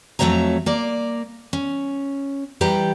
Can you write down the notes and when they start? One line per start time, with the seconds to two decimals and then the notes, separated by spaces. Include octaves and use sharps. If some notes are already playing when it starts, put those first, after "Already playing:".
0.19 F2 F#3 A3 C#5 E5 A#5
0.66 A#3 A#4 D5
1.53 C#4
2.61 E3 G3 G4 B4 G5 A#5